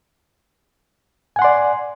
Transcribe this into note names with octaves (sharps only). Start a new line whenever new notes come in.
D5 F#5 G#5 C6